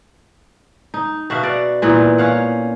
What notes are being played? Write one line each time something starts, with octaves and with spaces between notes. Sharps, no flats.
D#4
B2 F#4 E5 F5
D5 F#5
A#2 E3 B3 D#4
C#4 C#5 F5 F#5